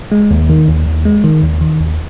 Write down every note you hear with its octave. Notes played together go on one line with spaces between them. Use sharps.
G#3
D#2
D#3
D#2
D#2
G#3
D#3
D#2
D#3
D#2